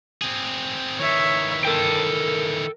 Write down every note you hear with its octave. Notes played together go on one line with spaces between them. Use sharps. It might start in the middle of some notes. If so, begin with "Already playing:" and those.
C4 G#4
D#3 E3 C#5 E5
A4 A#4 G5